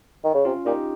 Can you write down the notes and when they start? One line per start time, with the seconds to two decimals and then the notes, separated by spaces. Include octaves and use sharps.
0.24 D#3
0.34 C#3
0.45 C3 C#4 F4
0.66 A#2 D#4 G4